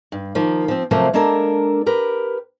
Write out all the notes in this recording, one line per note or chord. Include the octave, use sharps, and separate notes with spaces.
G2
D#3 F3 A#3
F3 C4
C3 F3 F#3 A3 A#3 C4
G#3 A#3 D4 A4 A#4
G4 A#4 B4